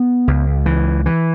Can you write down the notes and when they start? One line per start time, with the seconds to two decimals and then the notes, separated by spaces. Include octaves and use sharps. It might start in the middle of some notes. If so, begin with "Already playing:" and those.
Already playing: B3
0.28 C#2
0.66 E3
1.06 E3